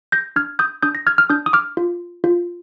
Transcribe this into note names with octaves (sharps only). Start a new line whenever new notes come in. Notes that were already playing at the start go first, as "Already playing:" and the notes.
G6 A#6
D4 F6 G#6
D#6 G6
D4 D#6 G6
A#6
F6 G#6
F6
D4 D#6 G6
D#6
D6 F6
F4
F4